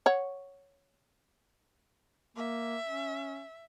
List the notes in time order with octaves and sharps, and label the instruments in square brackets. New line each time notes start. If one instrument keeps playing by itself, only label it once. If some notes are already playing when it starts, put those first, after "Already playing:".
[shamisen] C#5 F#5
[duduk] A#3 [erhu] E5
[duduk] C#4